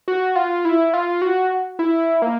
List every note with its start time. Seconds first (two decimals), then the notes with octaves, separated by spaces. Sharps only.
0.08 F#4
0.35 F4
0.65 E4
0.94 F4
1.22 F#4
1.79 E4
2.22 A#3